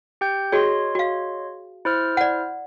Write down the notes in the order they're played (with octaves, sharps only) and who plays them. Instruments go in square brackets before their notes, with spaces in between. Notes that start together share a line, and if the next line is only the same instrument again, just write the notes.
[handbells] G4 G5 G6
[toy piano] F#4 G#4 [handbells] C#5 D#5 C6
[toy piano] F#4 F5
[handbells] E4 C5 F6
[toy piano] D5 F#5